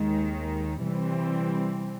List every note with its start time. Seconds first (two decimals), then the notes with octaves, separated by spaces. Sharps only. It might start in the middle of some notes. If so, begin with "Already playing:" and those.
Already playing: D#2 D#3 G#3
0.81 C3 E3 G3 C4